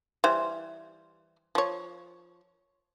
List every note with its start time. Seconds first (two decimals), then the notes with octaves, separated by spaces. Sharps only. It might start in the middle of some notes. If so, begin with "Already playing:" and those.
0.24 E3 G3 C5
1.55 F3 C#5